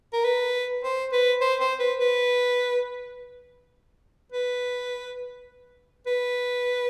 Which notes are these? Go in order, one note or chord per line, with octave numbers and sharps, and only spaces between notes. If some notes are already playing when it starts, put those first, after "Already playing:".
A#4
B4
C5
B4
C5
C5
B4
B4
B4
B4